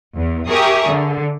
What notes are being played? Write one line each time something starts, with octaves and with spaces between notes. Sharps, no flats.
E2
G4 G#4 A#4 E5 C#6 D#6
D3